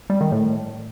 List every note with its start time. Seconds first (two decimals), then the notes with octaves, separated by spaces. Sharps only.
0.10 G3
0.21 D#3
0.32 A2